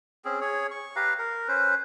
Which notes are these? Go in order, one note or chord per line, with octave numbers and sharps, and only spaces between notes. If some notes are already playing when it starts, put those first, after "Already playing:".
C4 C#4 G#4
G#4 C#5
C#6
G4 B4 F5 A#5
A#4
C#4 B4 C5